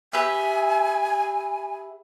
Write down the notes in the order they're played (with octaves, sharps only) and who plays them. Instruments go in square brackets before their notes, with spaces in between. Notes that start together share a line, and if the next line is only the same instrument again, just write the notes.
[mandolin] G4 B4 E5 [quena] G#5